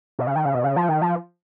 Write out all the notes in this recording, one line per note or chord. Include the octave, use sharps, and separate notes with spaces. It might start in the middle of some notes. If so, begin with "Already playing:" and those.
B2
C#3
D#3
C#3
B2
C#3
F3
D#3
F3